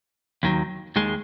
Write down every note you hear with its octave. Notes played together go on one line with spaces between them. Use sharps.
D#2 D#3 F#3
D#2 D#3 G#3